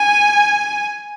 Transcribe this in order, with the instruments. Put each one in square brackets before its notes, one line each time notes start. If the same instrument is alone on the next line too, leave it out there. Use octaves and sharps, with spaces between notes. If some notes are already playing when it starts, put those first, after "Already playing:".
Already playing: [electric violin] G#5